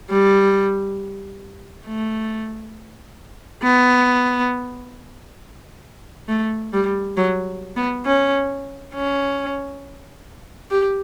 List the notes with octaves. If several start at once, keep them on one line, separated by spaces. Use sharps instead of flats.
G3
A3
B3
A3
G3
F#3
B3
C#4
C#4
G4